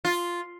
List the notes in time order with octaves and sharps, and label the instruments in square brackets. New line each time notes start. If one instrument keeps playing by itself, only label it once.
[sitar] F4